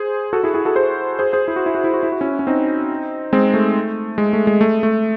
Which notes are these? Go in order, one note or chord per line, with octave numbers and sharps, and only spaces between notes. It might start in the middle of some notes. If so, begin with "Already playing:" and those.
Already playing: G#4 C5
F#4 A4
E4 G#4
E4 G#4
F#4 A4
G#4 C5
G#4 C5
G#4 C5
E4
F#4
E4
F#4
E4
F#4
E4
F#4
C#4 E4
C#4
C4 D#4
G#3 C4
A3
G#3
A3
G#3
A3
A3